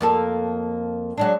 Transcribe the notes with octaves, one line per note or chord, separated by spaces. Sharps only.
F2 A#3 A4
F#3 G#3 D4